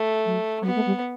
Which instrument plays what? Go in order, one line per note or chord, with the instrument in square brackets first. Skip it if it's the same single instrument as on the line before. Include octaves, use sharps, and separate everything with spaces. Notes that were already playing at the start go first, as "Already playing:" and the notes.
Already playing: [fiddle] A3
[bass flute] F#3
G3
[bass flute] F#3 [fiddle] B3
[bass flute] A3
G3